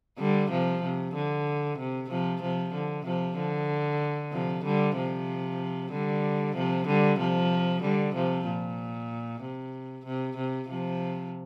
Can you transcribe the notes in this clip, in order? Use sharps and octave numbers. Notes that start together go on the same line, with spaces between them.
D3 G3
C3 F3
C3
D3
C3
C3 F3
C3 F3
D3
C3 F3
D3
C3 F3
D3 G3
C3 F3
D3 G3
C3 F3
D3 G3
C3 F3
D3 G3
C3 F3
A#2
C3
C3
C3
C3 F3